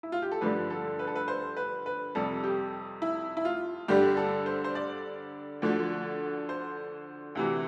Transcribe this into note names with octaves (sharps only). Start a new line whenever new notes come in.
E4
F4
G4
A4
G2 D3 F3 B4
A4
B4
A4
B4
C5
B4
B4
F2 C3 G3 A4
G4
E4
E4
F4
G2 D3 G3 G4
A4
C5
C5
D5
D2 D3 F3
C5
D2 C3 E3